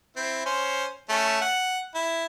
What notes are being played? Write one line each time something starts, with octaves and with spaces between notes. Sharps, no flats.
C4 E4
C#4 C5
A3 C#4 A4
F#5
E4